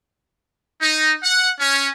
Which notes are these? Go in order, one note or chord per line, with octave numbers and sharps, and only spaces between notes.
D#4
F#5
C#4